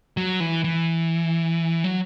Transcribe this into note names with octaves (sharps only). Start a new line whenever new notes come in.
F#3
E3
E3
F#3